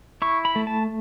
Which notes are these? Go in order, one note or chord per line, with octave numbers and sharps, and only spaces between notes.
E4 C#6
B5
A3
A5